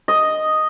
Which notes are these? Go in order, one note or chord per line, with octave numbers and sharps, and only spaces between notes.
D#5